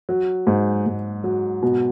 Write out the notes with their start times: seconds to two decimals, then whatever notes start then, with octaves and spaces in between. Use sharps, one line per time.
0.09 F#3
0.47 G#2
0.86 G#2
1.24 F#3
1.63 B2